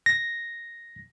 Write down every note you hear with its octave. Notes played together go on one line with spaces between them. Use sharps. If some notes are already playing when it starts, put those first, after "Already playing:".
A#6